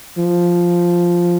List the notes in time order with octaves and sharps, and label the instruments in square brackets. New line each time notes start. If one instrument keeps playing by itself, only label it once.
[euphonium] F3